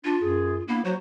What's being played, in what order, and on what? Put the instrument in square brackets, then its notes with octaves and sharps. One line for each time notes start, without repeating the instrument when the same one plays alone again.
[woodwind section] D4 [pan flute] F4
[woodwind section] F#2 G#4
[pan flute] A#3 [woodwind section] B3 D4 E4
[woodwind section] F#3 F#4 [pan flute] C5